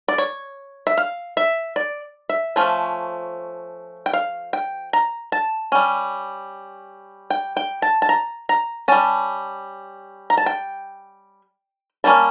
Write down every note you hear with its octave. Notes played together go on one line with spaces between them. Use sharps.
D5
C#5
E5
F5
E5
D5
E5
F3 A3 C#4
G5
F5
G5
A#5
A5
G3 C#4
G5
G5
A5
A5
A#5
A#5
G3 C#4 A5
A#5
A5
G5
G3 A#3 C#4 A5